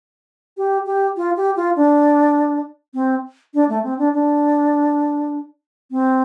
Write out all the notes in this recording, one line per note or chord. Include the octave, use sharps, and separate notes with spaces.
G4
G4
F4
G4
F4
D4
C4
D4
A3
C4
D4
D4
C4